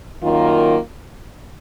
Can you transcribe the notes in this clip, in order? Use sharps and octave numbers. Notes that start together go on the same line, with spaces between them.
F#2 D#3 A#3 F4 A#4